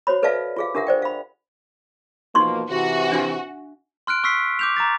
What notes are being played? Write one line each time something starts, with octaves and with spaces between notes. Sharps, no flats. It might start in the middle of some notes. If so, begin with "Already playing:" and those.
F#4 C5 C#5 B5
A4 B4 D5 E5 F5 A5
F4 G#4 F5
D4 G4 A#4 E5 F#5
C5 D5 G5
F5 B5
B2 F3 A#3 D#4 C6 C#6
C3 E3 F#4
D4 E5 G#5
C6 F6 F#6 D7
C#6 E6 F6 B6 C7
D6 G6 F7
A#5 D6 A6